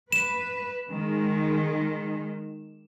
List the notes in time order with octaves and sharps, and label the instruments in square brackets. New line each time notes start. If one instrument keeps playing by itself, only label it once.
[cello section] B4 [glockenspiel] E7
[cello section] D#3 G#3